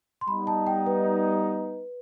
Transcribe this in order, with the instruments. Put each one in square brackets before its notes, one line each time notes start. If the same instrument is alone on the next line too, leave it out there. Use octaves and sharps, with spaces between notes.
[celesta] C6
[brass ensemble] G3 B3 D#4 [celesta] B5
[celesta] A5
G5
B4